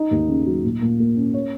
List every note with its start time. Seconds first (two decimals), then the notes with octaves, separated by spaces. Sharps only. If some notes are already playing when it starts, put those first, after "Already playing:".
Already playing: D#4
0.11 D#2
0.29 C#3
0.46 F#3
0.64 A#2
0.81 A#2
0.99 A#3
1.16 C#4
1.34 C#5